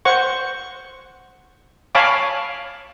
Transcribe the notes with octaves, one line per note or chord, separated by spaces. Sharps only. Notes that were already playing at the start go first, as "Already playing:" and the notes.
C5 F#5 C#6
C#5 F5 G#5 A5 B5 D6